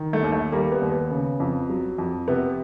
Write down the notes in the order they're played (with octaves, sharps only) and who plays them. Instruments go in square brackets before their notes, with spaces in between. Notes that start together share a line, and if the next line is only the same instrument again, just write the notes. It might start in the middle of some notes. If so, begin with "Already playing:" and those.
Already playing: [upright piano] D#3
A3
D#2
A3
G3 A#3
B3
D#2
B3
C#3
F2
F#3
F2
C3 B3